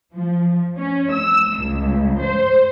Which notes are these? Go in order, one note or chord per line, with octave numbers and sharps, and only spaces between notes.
F3
C#4
E6
C#2
C5